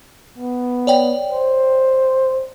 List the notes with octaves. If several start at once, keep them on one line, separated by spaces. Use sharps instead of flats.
B3
C#5 D5 G5
C5